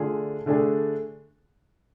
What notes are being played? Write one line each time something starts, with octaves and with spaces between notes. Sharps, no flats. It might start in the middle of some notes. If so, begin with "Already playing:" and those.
Already playing: D3 A3 D4 F4 G#4
D3 A3 D4 G#4